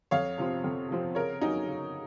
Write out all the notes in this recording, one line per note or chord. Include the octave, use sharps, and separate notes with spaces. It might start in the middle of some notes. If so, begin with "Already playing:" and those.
F2 C#5 F5
C3 F3 C4
F2
C3 F3 C4
C#3 A#4 C#5
F#3 C#4 D#4
C#3